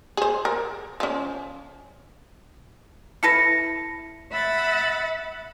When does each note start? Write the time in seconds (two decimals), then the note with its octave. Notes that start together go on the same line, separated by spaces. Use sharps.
0.17 G#4 C5
0.45 A#4
1.00 F3 C#4
3.23 E4 A4 B4 A#6 C#7
4.32 E5 F#5 B5 A6